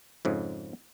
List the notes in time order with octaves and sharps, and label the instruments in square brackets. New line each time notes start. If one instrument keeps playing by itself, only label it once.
[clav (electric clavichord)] F2 G#2 C#3